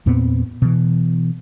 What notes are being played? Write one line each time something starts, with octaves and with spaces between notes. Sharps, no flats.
E2 A#2 B3 C4
B2 E3